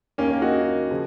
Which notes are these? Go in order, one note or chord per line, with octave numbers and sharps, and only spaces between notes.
D#2 D#3 A#3 C#4
A#3
D#4 F#4
C#3 F3